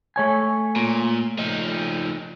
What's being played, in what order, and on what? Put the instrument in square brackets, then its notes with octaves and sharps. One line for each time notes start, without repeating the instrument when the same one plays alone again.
[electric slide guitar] A3 C#5 G#5
[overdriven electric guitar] A#2
F3 D#4